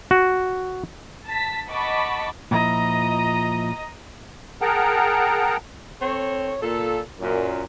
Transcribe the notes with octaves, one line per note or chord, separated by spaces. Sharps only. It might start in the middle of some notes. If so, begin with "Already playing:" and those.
F#4
A5 B6
D#5 F#5 A5 B5 C#6 D6
A#2 F3 E4 D#5 A#5
G#4 A#4 F#5 G5 A5 A#5
C4 A4 C#5
A#2 A4
F#2 A#2